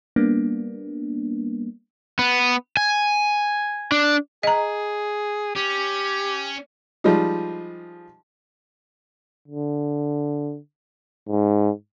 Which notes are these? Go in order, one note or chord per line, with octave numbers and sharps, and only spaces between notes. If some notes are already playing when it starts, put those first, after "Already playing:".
G3 A#3 B3 D4
B3
G#5
D4
G#4 D#5 A#5
C#4 G4
F3 G3 G#3 D#4
D3
G#2